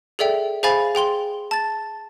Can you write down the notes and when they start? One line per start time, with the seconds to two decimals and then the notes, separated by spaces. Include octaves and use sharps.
0.19 G#4 A4 D5 E5 G5
0.63 G#4 C5 F5 G#5 B5 A6
0.95 G#4 G5 C6 G7
1.51 A5 A6